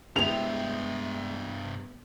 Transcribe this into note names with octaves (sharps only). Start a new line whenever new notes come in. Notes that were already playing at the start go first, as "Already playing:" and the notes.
G2 G#3 B3 E4 G4 C5 F7